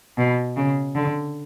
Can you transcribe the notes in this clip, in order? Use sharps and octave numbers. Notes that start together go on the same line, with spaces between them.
B2
C#3
D3